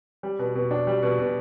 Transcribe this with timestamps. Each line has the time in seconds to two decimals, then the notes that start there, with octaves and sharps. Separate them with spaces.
0.23 G3
0.39 B2
0.55 B2
0.71 D4
0.87 G3
1.02 B2
1.19 B2